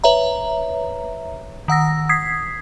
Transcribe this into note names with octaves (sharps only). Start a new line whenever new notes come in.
B4 C#5 E5 A#5
D#3 F#5 E6 A#6
D#6 G#6 B6 C7